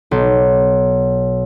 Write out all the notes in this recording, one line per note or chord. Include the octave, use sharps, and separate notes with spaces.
B1